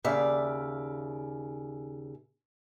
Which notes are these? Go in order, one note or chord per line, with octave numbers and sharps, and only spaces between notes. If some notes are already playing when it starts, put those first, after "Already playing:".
D#2 C#3 D5 E5 F5